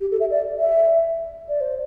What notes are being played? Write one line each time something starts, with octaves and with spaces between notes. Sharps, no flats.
G4
A4
E5
D5
E5
D5
C5